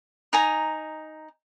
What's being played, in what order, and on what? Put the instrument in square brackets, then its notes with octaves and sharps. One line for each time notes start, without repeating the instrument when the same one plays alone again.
[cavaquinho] D#4 G#5 A#5